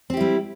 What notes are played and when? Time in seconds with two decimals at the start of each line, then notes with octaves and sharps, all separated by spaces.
0.10 C4
0.13 G4
0.17 E4
0.21 G3